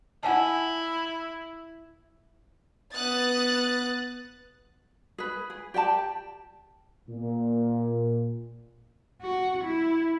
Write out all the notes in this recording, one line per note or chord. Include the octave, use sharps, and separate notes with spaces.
E4 F#5 G#5 A5
B3 D#6 F#6 A6
G#4 B4
G#4
G4 D5 G5 A5
A#2
F#4
E4